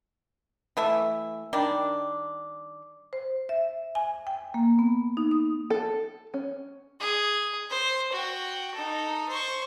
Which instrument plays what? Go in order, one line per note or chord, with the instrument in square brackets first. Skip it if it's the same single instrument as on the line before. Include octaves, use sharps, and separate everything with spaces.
[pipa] E3 A3 E5
D#3 G3 D4
[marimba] C5
E5
G#5
G5
A#3
B3
D#4
D#6
[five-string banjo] A4
C#4
[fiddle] G#4
C5
F#4 G5
D#4 A4
C5 C#6